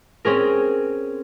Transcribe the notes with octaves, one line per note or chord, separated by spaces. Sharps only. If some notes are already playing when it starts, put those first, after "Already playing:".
C4 C#4 G#4 A#4